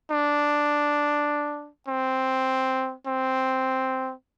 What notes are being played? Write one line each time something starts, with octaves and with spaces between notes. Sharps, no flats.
D4
C4
C4